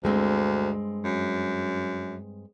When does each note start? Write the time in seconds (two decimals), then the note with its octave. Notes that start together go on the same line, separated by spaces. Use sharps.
0.04 D2 G2 G#3 C4
1.05 F#2